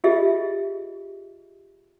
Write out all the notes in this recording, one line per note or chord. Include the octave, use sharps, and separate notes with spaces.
F4 G4 G#4 D#5 E5